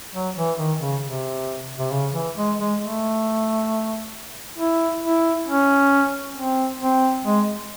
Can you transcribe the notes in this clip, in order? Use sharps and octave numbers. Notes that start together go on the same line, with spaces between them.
F#3
E3
D#3
C#3
C3
C3
C#3
E3
G#3
G#3
A3
E4
E4
C#4
C4
C4
G#3